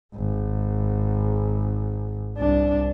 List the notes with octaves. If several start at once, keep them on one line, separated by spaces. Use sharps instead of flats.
G#1
C2 D4